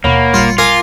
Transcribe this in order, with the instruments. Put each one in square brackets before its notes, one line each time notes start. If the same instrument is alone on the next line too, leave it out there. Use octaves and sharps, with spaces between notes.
[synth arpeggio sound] D#2 B2 [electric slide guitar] A#3 [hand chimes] C#5 F#5 B5
[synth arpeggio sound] G#1 A#2 G3 [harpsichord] F4 [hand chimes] C6 C#7
[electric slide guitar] F4 [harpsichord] A#4 G#5 [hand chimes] D6